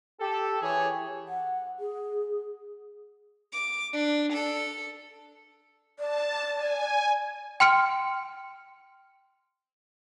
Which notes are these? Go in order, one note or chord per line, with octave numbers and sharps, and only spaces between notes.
G4 A4
E3 G4 G#4 C#5
F#5
G#4
D6
D4
A4
D5 A5
G#5
G5 C6 F6 C#7 D7